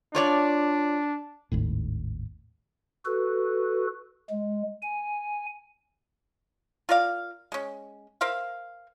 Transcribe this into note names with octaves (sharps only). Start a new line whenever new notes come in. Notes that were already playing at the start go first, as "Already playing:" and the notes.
D4 F4 C#5 D5
G#1 D#2 A2
F#4 A4 B4
G#3
G#5
F4 A#4 D5 F5
G#3 C#4
A#4 C5 E5 F5